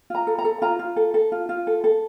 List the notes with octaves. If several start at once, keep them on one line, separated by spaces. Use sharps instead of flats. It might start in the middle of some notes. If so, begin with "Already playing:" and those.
F4 A#5
A4
A#5
A4
F4 A#5
F4
A4
A4
F4
F4
A4
A4